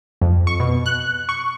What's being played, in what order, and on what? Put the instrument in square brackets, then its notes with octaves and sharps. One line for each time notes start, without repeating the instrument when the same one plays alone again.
[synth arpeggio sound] F2
C#6
B2
F#6
C#6